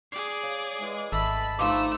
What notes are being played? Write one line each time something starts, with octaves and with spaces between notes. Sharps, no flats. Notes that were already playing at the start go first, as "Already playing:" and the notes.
G#4 D5 C7
C#5 F5
E3 G#3
G#1 A3 D#5 A5 B5 E6
G2 F3 A3 D#4 F5 C6 D6 E6